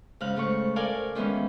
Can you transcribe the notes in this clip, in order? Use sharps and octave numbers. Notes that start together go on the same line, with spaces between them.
G#2 C#3 F5 F#6
G#2 A3 C#6
A4 A#4 D5 F5 G#5
D#3 E3 G#3 B3 C#4